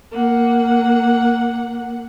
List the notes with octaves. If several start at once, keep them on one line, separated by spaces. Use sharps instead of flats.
A#3 F#5